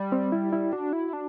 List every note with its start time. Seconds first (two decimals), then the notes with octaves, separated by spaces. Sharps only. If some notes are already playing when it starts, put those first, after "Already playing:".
Already playing: G3
0.12 C4
0.32 E4
0.53 E4
0.73 D4 F#4
0.93 E4
1.13 D4